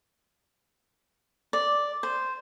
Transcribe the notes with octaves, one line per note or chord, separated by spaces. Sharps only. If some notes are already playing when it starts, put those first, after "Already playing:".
D5
C5